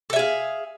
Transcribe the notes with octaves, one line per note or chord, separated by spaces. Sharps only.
G#4 A4 E5 F5